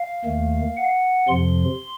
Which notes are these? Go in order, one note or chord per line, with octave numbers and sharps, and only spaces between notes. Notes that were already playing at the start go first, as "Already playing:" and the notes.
Already playing: F5
D#2 D#3 A3
F#5
F2 C3 F3 C6